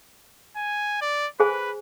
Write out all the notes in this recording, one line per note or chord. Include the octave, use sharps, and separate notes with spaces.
G#5
D5
G#4 B4 C5 G#5